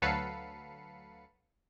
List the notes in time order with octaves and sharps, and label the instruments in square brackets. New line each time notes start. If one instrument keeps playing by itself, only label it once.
[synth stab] D2 F#3 A4 B4 F5 C#7